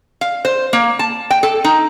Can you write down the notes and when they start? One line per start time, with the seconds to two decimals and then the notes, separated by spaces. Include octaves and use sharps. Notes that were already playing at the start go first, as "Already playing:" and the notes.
0.21 F5
0.45 C5
0.73 A#3
0.99 A5
1.30 G5
1.43 A4
1.64 D#4